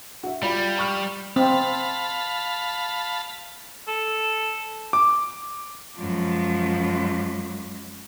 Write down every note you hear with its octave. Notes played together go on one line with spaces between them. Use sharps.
F#4 E5
G3 F4 D5 B5
B5 C#6 F6
C4 F5 A5 B5
A4
D6
F#2 F3 G#3